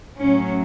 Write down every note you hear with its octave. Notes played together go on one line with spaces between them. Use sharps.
A2 F#3 C#4